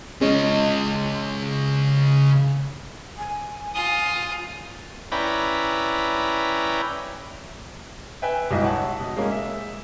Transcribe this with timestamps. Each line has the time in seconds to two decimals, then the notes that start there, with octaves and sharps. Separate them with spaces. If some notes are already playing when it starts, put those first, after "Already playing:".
0.21 C#3 G#3 C#4 D#5
3.18 G#5
3.75 F4 D#6
5.12 C#4 E4 B4 D5 G5 A#5
8.22 B4 E5 G5 G#5
8.51 B1 G#2 E4 D#5
8.63 C#5 E5 F#5 A5
8.99 B2
9.17 G#3 A#3 C#4
9.31 E5